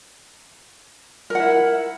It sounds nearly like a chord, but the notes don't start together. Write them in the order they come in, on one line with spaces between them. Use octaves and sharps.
A#4 F#5 E4